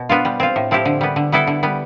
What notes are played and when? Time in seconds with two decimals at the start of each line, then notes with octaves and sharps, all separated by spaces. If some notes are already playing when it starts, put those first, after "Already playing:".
Already playing: B2
0.09 B3 D4 F4
0.25 G3
0.40 C4 F4
0.56 A2
0.71 F3 C4 E4 G4
0.85 D3
1.01 G3 B3
1.16 D3
1.32 G3 B3 E4 A4
1.47 D3
1.63 G3 B3